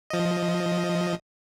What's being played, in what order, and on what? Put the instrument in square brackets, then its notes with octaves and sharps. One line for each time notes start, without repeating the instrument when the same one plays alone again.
[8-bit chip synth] F3 D#5